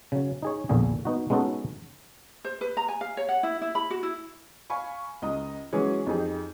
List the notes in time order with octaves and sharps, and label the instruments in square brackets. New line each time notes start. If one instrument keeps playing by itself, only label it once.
[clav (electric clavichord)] C#3 F#3
D#4 G#4 C#5
A#1 E2 A#2 D3 G#4
B3 D#4 F#4
G#3 B3 C#4 D#4 F#4 A4
[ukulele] C5
B4
A#5
G#5
F5
C#5
F#5
E4
E4
B5
F#4
E4
[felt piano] F5 G#5 B5 C#6
C#2 D#5 A#5 D#6
E3 F#3 G#3 C#4 G#4
F2 D#4 G4 G#4